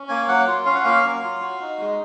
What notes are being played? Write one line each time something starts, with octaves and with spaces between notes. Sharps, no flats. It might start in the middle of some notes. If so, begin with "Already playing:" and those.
Already playing: C#4
A#3 G#5
F#3 F#5
F4
C#4 F5
F#5
A#3 F5
F#3
F4
F#4
D#4
G#3